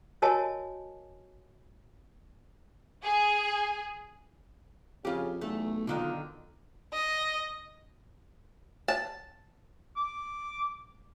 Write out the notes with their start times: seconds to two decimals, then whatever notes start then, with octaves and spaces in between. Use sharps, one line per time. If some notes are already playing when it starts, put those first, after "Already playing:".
0.22 F#4 A#4 C#5 D#5 G#5 A5
3.04 G#4
5.05 F2 C#3 F4 G4
5.41 B1 E2 A3
5.87 D3 D#3 D4 F4
6.93 D#5
8.88 A5
9.97 D6